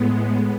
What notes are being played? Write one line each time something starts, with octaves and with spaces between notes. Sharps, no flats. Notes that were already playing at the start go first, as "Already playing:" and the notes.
Already playing: A2 G#3 B3